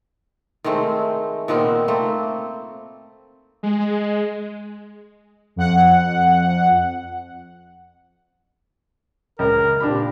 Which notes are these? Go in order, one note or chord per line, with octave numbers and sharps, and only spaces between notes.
D#3 G#3 A3 C4
A#2 D#3 B3 C4
A3 A#3 C4
G#3
F2 F#5
C#2 A#4
A#2 D4 G4 B5